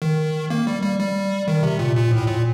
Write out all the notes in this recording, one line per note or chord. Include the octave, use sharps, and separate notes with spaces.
D#3
A#3
G3
G3
G3
D#3
C3
A#2
A#2
A2
A#2